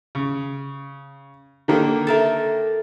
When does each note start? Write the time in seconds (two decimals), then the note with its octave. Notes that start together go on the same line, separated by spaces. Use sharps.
0.15 C#3
1.68 D3 D#3 A#3
2.07 A4 A#4 E5